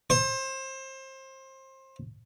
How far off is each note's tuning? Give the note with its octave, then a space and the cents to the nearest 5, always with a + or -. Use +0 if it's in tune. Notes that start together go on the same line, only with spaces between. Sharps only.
C5 +25